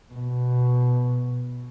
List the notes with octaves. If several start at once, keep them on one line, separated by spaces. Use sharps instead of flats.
B2